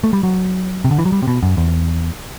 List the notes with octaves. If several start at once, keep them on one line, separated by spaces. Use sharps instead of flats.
A3
G3
F#3
C3
D3
E3
F#3
G3
C3
B2
F#2
E2